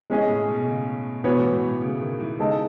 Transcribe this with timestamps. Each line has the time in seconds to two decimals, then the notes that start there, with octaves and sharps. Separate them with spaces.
0.10 E3 G#3 C#4 G#4 D#5
0.29 A2
0.48 B2
0.66 C#3
1.24 B2 E3 B3 F#4 C#5
1.38 A2
1.53 A2
1.67 A2
1.81 C#3
2.00 D#3
2.20 E3
2.39 C#3 G#3 D#4 A4 D#5